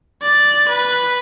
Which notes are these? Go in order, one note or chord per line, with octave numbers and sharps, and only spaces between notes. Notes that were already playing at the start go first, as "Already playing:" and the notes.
D5
B4